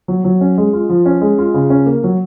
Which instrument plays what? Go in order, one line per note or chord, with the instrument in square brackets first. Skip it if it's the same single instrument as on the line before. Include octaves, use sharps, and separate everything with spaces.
[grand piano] F#3
F#3
C#4
G#3
F4
F3
C#4
G#3
F4
C#3
C#4
A#3
F#3